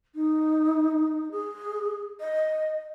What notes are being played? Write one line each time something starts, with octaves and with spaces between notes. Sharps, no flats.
D#4
G#4
D#5